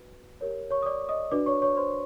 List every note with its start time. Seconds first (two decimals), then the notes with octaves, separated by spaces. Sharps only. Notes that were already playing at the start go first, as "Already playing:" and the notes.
Already playing: F#4 B4
0.41 G4 A#4 C#5
0.71 C#5 C#6
0.82 D#6
0.86 D5 D6
1.09 D#5 D#6
1.31 D4 F#4 B4 D5 D6
1.46 C#5 C#6
1.62 C#5 C#6
1.77 C5 C6